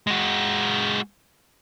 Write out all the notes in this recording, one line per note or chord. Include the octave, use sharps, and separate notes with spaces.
G#3 F#4